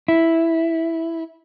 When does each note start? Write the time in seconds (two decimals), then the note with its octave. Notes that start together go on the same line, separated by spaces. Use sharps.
0.08 E4